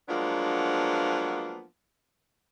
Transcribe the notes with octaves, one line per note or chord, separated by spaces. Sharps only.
F3 F#3 G#3 A#3 B3 D4